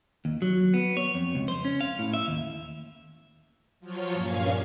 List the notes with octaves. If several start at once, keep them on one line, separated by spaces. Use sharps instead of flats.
D#2
F#3
B3
C#5
F2
C#2
C5
C#4
F5
A2
E5
D#2
F3 F#3 F4 C#5
G2 A#2 C#4 F5 G#6